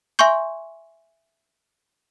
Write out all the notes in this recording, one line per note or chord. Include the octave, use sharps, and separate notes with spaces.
E5 G#5 C6 C#6 G6